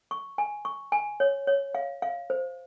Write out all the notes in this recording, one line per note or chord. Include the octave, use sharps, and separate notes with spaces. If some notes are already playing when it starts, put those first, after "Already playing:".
C#6
G#5
C#6
G#5
C#5
C#5
F5
F5
C5